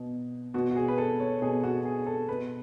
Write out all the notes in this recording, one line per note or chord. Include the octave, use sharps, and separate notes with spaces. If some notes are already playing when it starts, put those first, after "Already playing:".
Already playing: B2
B2 F#4
F#4
G#4
B4
A4
C#5
B2 G#4
F#4
G#4
A4
B2 B4